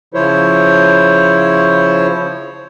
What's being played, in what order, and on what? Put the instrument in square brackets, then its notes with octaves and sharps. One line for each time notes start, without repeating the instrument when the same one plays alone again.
[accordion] C#3 F3 E4 C5 C#5